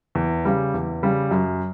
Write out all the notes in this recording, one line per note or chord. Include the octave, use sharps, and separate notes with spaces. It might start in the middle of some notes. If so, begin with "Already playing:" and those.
E2
C#3 G3
E2
C#3 G3
F#2